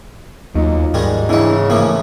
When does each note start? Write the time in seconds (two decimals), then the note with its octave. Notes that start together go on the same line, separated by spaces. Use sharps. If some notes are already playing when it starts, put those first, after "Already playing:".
0.55 D#2 F#3 D#4 F4
0.94 G#2 D#3 G3 G#3
1.29 C#3 E3 C4 D4 E4 D#5
1.70 A2 E3 F3 A#3